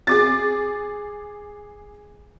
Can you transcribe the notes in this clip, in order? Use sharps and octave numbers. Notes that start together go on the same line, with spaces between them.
G#4 D6 A6